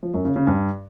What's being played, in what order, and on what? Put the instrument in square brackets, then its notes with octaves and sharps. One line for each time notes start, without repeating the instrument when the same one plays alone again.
[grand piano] F3
F#2
C#3
C#3
G2